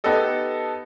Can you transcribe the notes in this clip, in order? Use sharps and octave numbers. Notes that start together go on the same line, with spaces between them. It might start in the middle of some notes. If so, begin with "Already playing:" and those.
B3 D#4 G4 A4 D#5